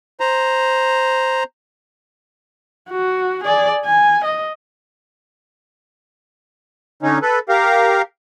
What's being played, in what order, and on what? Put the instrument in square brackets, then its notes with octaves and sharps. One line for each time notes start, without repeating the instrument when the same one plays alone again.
[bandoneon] C5 A#5
[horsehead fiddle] F#4
G#4 D5
G#5
D#5
[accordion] D3 C#4 D#4
A4 B4
G4 A#4 F5